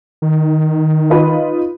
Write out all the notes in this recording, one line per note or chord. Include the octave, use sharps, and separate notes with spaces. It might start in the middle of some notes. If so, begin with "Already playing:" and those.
D#3
D#4 F4 B4